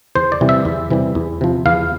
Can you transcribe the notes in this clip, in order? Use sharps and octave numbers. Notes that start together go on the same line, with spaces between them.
E2 C5
D5
C3 E3 G3
E5
E2
C3 E3 G3
E2
C3 F3
E2 F5